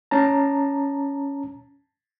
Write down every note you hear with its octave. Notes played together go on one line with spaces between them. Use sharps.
C#4 A5 A#5